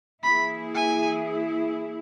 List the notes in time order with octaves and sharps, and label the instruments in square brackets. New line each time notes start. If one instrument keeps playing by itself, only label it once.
[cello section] E3 A#3 E4 G#4 [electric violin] B5
[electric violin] G#5